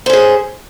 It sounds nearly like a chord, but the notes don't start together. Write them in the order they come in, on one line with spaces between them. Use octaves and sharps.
C5 C#4 G#4